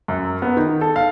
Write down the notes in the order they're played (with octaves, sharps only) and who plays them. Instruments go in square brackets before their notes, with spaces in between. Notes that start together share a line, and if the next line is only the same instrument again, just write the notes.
[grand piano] F#2
B3
D#3
A4
F5